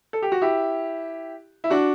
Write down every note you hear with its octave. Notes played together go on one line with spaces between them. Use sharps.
A4
G4
F#4
E4 G4
E4
D4 F#4